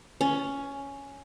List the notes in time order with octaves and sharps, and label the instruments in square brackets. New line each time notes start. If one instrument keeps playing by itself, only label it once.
[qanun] C#4